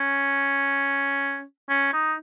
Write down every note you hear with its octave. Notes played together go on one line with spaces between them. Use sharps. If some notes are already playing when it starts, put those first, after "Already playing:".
Already playing: C#4
C#4
D#4